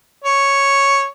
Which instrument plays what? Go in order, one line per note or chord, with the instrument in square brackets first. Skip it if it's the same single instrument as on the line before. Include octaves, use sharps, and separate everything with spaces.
[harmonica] C#5